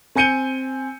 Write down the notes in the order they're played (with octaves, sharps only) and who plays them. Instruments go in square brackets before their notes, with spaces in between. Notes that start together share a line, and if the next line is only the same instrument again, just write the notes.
[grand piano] C4 G#5 G6 C#7 D#7 G7